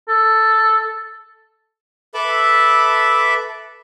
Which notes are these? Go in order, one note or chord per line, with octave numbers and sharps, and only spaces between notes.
A4
A4 B4 E5 A5 B5 D6